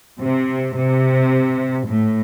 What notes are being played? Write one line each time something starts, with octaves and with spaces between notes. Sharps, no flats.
C3
C3
A2